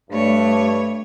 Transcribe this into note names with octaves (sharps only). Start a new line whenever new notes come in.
G2 A3 C#5